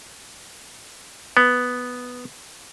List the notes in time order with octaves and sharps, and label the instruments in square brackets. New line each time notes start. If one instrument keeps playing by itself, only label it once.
[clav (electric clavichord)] B3